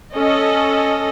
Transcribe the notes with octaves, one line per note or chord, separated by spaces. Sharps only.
C#4 A4 D#5